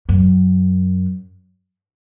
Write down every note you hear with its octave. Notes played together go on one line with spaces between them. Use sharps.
F#2